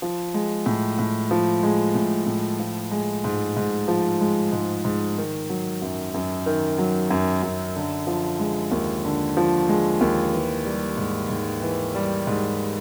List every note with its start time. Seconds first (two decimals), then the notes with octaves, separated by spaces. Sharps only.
0.02 F3
0.34 G#3
0.66 A2
0.99 A2
1.31 F3
1.63 G#3
1.95 A2
2.27 A2
2.59 F3
2.91 G#3
3.24 G#2
3.57 G#2
3.88 F3
4.21 G#3
4.52 G#2
4.85 G#2
5.18 D#3
5.49 F#3
5.82 F#2
6.14 F#2
6.46 D#3
6.78 F#3
7.10 F#2
7.43 F#2
7.76 D3
8.07 F3
8.40 G#3
8.71 D#2
9.05 D3
9.37 F3
9.69 G#3
10.01 D#2
10.33 E3
10.65 G3
10.97 G#2
11.29 G#2
11.62 E3
11.95 G3
12.27 G#2